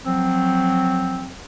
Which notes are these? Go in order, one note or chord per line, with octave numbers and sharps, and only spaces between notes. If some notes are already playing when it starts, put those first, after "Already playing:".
F3 F#3 C4